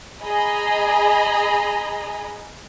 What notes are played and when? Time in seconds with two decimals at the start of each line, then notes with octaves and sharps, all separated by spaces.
0.22 G#4 D#5 G#5 A#5 B5